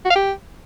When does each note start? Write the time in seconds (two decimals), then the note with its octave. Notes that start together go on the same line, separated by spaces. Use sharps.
0.05 F#4
0.10 F5
0.15 G4